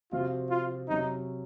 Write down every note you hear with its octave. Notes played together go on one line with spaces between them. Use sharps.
C3 F3 C4 F4 F#4
F4
C3 F#3 C#4 D#4